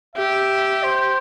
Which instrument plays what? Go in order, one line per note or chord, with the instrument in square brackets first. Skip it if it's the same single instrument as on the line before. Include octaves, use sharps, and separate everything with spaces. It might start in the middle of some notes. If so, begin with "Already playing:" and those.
[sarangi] G4 [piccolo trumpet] E5
[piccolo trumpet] C5